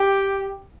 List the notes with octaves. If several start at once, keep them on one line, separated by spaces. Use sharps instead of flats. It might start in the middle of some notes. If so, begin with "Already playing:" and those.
Already playing: G4